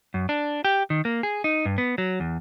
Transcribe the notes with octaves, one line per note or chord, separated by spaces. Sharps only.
F#2
D4
G4
D#3
A#3
G#4
D#4
G2
B3
F#3
E2